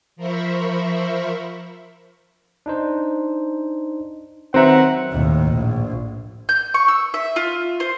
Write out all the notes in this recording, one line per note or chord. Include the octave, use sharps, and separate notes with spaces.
F3 A#4 C5 E5 B5 C#6
D4 D#4 C5
D#3 F#3 C4 B4 C5 E5 F#5 A#5
D#2 A2
A#1
G6
C#6
E6
E5
F4
C5